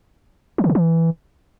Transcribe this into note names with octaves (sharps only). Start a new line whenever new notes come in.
F3
D3
C#3
E3